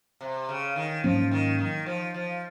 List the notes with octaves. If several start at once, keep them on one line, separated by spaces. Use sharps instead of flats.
C3
C#3
D#3
G#2 F3 F#3 A#3 C#4
D#3
D#3
F3
F3